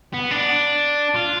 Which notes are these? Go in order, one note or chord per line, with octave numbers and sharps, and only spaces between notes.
B3
D4
F4